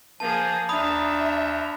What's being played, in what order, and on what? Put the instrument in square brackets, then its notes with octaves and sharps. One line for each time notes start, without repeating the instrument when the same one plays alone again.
[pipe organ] F3 [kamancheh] A#3 G#4 [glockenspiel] A5
[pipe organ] D#2 A#5 [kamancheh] D4 E5 [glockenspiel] B5 D#6